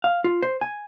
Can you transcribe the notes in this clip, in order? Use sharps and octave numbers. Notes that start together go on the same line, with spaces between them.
F5
F4
C5
G#5